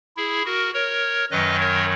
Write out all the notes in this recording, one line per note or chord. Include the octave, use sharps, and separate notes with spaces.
E4 G#4
F#4 A#4
A#4 C#5
F#2 D#3 F#3 B4 D#5
A#4 C#5